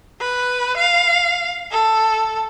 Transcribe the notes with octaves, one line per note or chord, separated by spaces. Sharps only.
B4
F5
A4